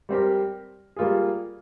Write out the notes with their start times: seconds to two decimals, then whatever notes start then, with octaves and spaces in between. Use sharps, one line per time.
0.09 G3 C4 G4 A#4
0.96 G3 A#3 F4 G#4